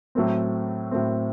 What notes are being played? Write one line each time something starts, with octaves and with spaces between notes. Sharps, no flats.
A2 F#3 A3 C4
A2 F#3 A3 C4